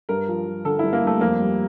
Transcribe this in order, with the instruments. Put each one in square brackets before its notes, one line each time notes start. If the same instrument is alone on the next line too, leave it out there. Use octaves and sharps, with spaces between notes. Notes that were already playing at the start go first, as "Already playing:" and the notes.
[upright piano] G2 A#4
F3
F3
D3 A4
E4
G2
A#3
G2 A3
F2 A#3
G3